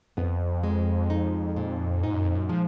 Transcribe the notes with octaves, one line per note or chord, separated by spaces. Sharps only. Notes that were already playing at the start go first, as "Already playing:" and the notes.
F2 B3
G#3
D#4
A#2
G#2 D#4
F#2
F2
F#2
F3 G#3